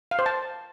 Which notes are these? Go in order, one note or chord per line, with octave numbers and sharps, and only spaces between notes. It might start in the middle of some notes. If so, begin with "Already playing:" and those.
F5
C5
A5